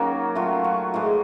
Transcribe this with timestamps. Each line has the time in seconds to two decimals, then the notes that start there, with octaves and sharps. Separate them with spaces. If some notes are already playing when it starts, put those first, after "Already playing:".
Already playing: D#3 F#3 A#3 C#4 F#4
0.35 D#3 F#3 A3 F4
0.64 F#4
0.94 A2 E3 G#3